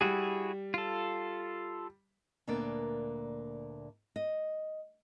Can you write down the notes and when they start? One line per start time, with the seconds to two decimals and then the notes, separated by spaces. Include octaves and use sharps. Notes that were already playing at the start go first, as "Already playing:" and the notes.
0.01 G3 E4 F#4 G#4
0.74 F4 A4
2.47 D2 A#2 A#3 B3 D4 D5
4.16 D#5